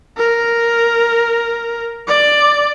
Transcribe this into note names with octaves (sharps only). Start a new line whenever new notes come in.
A#4
D5